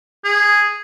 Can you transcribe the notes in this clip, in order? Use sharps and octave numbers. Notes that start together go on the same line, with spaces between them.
G#4